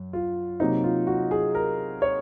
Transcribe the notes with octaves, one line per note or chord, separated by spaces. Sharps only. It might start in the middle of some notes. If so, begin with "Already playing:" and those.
Already playing: F#2
F4
C3 F#3 A#3 D#4
F4
F#4
G#4
A#4
C#5